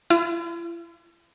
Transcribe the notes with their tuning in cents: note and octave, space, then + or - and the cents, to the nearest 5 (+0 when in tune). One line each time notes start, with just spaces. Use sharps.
E4 +45